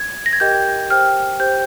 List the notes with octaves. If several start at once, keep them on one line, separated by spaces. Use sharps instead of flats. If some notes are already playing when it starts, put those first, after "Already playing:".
Already playing: G#6
A#6
G#6
G4 A#4 D#5 G5 G6
G4 C5 G5 F6
G4 C5 G5 G6